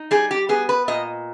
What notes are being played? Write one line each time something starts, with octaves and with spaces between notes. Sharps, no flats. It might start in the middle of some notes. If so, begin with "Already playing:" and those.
Already playing: D#4
G3 G#4
G4
B3 G#4
B4
A#2 D#5